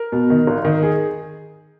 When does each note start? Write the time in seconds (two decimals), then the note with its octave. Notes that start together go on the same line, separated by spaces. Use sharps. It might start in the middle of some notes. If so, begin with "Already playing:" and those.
Already playing: A#4
0.12 B2
0.30 D#3
0.47 G#1
0.65 D#3
0.83 G#4